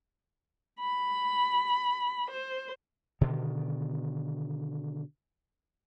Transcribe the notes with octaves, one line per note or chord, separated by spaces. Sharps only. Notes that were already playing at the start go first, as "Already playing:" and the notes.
B5
C5
B2 D3 D#3